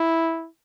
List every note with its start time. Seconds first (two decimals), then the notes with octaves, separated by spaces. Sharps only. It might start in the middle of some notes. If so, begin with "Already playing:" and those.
Already playing: E4